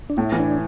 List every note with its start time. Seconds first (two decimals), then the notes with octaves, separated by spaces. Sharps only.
0.10 D4
0.17 A2 E4
0.32 E3
0.40 D4